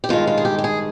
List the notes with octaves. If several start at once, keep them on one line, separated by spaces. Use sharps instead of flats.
G4
G2 D#3 G#3 F4
F4
G#4
G4
G4
G#4